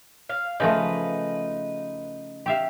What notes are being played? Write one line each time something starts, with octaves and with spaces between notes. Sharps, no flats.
F5
C#3 F3 A3 D#4 B4
G4 E5 F5